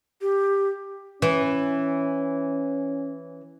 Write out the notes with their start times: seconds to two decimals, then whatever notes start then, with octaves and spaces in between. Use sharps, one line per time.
0.21 G4
1.22 E3 C#4